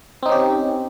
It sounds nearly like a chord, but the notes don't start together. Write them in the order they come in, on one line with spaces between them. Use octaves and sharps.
C4 D#4 C#4 G4